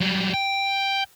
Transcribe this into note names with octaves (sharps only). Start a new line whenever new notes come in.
F#3 G3
G5